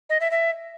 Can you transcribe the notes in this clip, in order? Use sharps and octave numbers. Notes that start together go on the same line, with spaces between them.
D#5
E5
E5